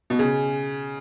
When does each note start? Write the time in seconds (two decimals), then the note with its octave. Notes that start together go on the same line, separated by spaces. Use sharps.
0.10 B2
0.19 C#3